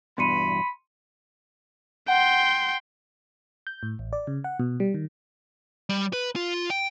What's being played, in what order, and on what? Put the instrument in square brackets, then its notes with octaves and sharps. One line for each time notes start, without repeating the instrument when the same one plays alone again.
[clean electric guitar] E2 G2 B2 [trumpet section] B5 [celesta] C6 C#7 D#7
[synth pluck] F#5 [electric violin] G5 C6
[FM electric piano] G6
A2
A1
D5
C#3
F#5
B2
G3
D#3
[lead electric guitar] G3
B4
F4
G5